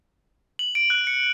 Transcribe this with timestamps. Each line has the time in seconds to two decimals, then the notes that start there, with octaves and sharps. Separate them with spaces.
0.59 F#7
0.75 D7
0.90 F#6
1.07 C#7